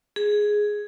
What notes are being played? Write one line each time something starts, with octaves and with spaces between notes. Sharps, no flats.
G#4